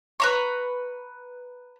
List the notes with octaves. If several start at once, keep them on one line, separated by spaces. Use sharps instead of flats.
B4 A#5 C#6